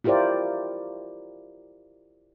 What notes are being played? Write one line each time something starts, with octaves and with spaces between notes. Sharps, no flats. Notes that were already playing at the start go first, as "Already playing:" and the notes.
E4 F4 G4 A#4 C5 D5